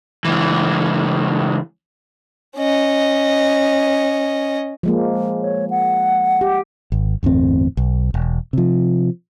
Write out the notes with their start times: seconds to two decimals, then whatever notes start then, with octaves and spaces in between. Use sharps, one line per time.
0.25 C#2 E3
2.57 C#4 D#5
4.83 F3 G#3 A#3
5.41 C#5
5.70 F#5
6.41 G4
6.92 G#1
7.23 G1 E2 A2 C4
7.77 B1
8.14 E1
8.53 C3 F3